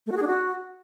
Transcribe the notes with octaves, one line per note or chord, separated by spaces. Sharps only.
A3
F#4
G#4
D4
F#4